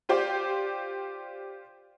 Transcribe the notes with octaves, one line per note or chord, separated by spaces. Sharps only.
F4 G4 C5 D5